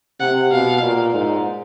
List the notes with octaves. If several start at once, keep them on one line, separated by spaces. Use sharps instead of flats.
C3 F#5
B2 F5
A#2
G#2